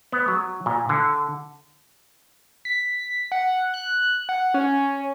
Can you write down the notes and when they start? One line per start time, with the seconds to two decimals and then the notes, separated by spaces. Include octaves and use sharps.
0.12 B3
0.28 F#3
0.66 A#2
0.89 D3
2.65 B6
3.32 F#5
3.74 F#6
4.29 F#5
4.54 C#4